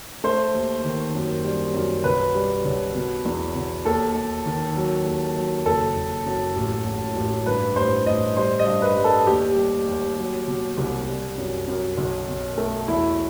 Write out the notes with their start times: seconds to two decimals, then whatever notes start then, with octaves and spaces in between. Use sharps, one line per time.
0.24 A3 C5
0.54 D#2
0.84 D#3
1.15 F#2
1.44 G3
1.74 F#2
2.04 B1 B4
2.35 G3
2.65 B1
2.95 B2
3.25 E2
3.55 B2
3.85 D#2 A4
4.15 D#2
4.45 D#3
4.76 F#3
5.06 D#2
5.35 F#3
5.65 F#1 A4
5.96 F#1
6.26 F#2
6.56 A1
6.86 A1
7.16 A1
7.46 G2 B4
7.76 A1 C5
8.06 A1 D#5
8.37 G3 C5
8.59 D#5
8.66 G2
8.82 B4
8.97 G3
9.04 A4
9.27 D#2 G4
9.57 G3
9.87 D#2
10.17 F#3
10.47 B2
10.77 C2
11.08 G3
11.38 F#2
11.68 F#2
11.98 B1
12.28 B2
12.58 A3
12.88 E2 E4